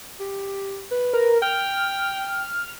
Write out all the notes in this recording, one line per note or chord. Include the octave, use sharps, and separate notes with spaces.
G4
B4
A#4
G5 F6